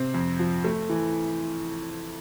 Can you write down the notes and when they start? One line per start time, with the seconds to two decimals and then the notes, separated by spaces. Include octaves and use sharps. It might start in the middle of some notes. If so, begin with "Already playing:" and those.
Already playing: C3 C4
0.14 F2
0.39 F3
0.64 A3
0.89 E3